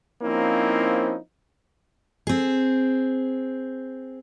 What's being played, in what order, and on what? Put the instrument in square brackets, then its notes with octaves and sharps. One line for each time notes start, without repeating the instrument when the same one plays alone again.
[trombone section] F3 A#3 C4 C#4 D#4 E4
[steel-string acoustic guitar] C4 G#4